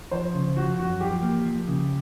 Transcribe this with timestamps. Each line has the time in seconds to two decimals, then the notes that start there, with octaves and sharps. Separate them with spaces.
0.11 F3 C5
0.34 C#3
0.56 F3 F#4
0.78 F#2 F#4
1.01 F3 G4
1.22 A#3
1.45 F3
1.67 C#3